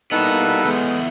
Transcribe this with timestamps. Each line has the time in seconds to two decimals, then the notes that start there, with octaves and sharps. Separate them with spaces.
0.12 G3 A#3 B3 D#4 E4 F#4 A4 B4
0.65 E2 G#3 A3 B3